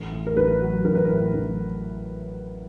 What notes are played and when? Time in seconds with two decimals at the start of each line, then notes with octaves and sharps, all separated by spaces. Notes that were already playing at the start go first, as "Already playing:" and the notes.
Already playing: A1
0.12 A2
0.27 A#4
0.36 A1 B4
0.62 F#3
0.85 A1 A#4
0.95 B4
1.05 A2 A#4
1.34 A1